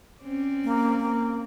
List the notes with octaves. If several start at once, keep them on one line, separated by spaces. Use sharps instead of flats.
C4 C#4 D5
A#3
A#3